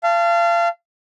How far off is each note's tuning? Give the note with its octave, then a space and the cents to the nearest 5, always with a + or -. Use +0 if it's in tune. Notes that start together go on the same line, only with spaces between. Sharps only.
F5 -30 A5 +0